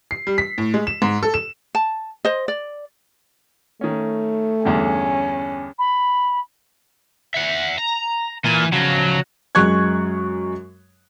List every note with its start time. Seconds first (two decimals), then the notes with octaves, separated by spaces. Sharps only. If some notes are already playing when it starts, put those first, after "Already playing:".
0.11 C7
0.27 G3
0.38 B6
0.58 A2
0.74 G#3
0.87 E7
1.02 G#2
1.23 A4
1.34 E7
1.75 A5
2.25 C5 D#5
2.48 D5
3.81 D#3 A3 C#4
4.65 E2 G2 D3 C#4
5.78 B5
7.34 E5 F#5
7.78 A#5
8.44 A#2 E3 G#5
8.73 C#3 F3 F#3
9.55 F#2 G#3 C#6 F#6 G#6